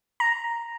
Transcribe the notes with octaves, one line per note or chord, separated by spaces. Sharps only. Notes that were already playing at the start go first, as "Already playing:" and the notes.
A#5